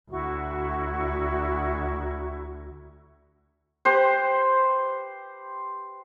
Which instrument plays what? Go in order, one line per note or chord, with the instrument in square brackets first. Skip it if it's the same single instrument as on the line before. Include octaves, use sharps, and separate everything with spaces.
[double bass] D2 [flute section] E4 F#4 C#6
[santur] G4 B4 C5